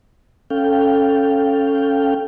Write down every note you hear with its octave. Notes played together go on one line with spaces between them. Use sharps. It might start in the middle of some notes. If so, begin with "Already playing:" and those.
C#4 A4 F5 G5